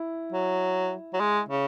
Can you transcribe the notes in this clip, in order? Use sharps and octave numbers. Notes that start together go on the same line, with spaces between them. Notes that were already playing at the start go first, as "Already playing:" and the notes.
Already playing: E4
F#3
F#3
G#3
C#3